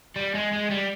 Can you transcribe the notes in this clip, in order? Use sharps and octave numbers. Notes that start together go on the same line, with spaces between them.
G3
G#3
G#3
G3